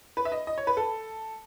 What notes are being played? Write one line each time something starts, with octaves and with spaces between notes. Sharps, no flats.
B4
E5
D#5
D#5
C#5
B4
A4